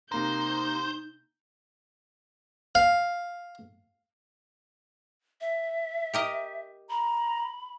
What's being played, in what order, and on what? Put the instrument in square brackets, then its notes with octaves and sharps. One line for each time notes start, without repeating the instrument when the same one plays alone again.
[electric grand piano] C3 A#3 A#5 [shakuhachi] D#4 [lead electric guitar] C5 [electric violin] G6
[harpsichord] F5
[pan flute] E5
[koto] G4 A#4 D#5
[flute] A#5 [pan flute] B5